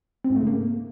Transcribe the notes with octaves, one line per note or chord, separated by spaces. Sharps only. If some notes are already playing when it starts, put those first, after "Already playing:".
C4
G#2
A3
C#3
A#3